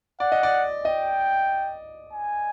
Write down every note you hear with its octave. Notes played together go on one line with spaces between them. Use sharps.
D5 F#5
D#5
D5
D#5 G5
G#5